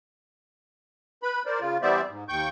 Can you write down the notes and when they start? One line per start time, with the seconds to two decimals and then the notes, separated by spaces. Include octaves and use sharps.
1.23 B4 B5
1.46 A#4 C5 D5
1.60 C#3 F4
1.82 E3 G3 B3 C5 D5 E5
2.09 G#2
2.29 D#2 G5 C#6 G6